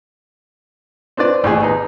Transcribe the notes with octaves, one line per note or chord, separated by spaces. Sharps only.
C4 D4 B4 D5
A1 D#2 G#4
B3 D#4